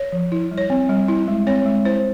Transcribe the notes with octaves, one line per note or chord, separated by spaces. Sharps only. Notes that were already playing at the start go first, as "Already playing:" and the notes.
Already playing: C#5
F3
E4
G3
C#5
C4
G3
E4
G#3
C4 C#5
G#3
E4 C5